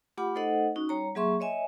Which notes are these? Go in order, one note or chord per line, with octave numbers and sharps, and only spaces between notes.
A3 F4 G4 F#5 B5 D6
A3 D#4 A4 C5 D#5 F#5
C#4 D#4 F#4
G3 C#5 A#5
F#3 A#3 G#4 E5 C6 C#6
C#5 D#5 E5 G#5